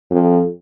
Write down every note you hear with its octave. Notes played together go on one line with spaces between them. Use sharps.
F2